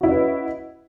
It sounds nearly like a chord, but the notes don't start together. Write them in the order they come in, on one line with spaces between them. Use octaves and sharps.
F#4 E4 C#4 D#5 B4